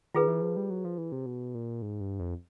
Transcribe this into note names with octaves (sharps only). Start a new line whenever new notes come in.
D#3 F4 G#4 B4
E3
F3
G3
F#3
F3
E3
C3
B2
A#2
G#2
G2
F2